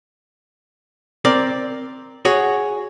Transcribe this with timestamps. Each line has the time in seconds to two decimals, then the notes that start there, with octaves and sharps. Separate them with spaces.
1.25 C4 A#4 D5
2.25 F#4 G#4 C#5